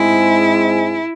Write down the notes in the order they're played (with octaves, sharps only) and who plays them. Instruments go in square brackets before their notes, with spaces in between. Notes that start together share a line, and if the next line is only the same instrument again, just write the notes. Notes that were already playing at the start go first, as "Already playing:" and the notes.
Already playing: [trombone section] G#2 G#3 C4 G#4 [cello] E4